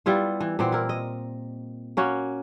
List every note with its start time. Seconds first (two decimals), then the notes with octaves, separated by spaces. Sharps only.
0.06 G3 B3 E4 F4
0.41 E3
0.59 A#2 E3 B3 C4
0.72 E4 A#4
0.89 D#5
1.97 A#3 C#4 F#4